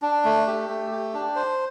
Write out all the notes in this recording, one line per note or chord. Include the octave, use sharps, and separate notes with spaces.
D4
A3
G4
A3
G4
D4
C5